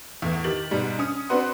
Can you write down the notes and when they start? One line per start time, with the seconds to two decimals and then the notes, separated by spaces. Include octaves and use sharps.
0.22 E2 A2
0.44 D#3 G4 A6 F#7
0.71 G#2 B2 G3
0.99 C#4 D#6
1.29 C4 D4 F#4 B4 F#5 C6